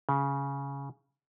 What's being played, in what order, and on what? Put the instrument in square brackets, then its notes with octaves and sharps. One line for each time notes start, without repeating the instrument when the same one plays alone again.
[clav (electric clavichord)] C#3